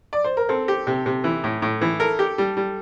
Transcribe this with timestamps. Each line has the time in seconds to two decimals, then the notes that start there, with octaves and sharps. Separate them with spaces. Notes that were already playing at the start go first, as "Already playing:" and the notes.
0.13 D5
0.24 C5
0.37 A#4
0.49 C4 A4
0.68 G4
0.87 C3
1.06 C3
1.24 E3
1.44 A2
1.62 A2
1.81 E3
2.00 A4 A#4
2.19 G4
2.38 G3
2.57 G3